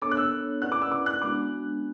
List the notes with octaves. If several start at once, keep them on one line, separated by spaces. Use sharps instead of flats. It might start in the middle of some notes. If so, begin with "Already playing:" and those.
B3 D4 A4 C#5 D6
F#6
E6
C#4 E4 B4 D5 F#5 F#6
D6
E6
D6
F#6
G#3 B3 D4 F#4 D6